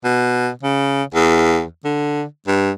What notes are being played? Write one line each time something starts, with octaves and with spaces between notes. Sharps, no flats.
B2
C#3
E2
D3
G2